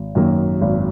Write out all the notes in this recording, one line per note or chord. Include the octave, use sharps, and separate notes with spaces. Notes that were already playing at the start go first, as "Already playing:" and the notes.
Already playing: G#1
F#2 D#3 F#3 A#3
G#1